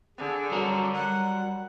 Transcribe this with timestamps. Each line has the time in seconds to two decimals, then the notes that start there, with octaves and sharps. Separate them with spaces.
0.18 D3 G#4
0.52 F#3 G3 F#4 A#4
0.95 G3 F#5